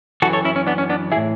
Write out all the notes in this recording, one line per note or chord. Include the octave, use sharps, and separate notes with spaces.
F#2 E3 F#4 A4
A4 C#5
C#4 E4
C#4
B3 D4
C#4
B3 D4
A2 E3 E4 G#4